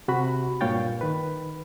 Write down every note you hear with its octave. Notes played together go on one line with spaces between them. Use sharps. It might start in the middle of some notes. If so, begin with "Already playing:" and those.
C3 F#4 B5
G2 A#2 C#5 F5 G5 A6
D#3 B4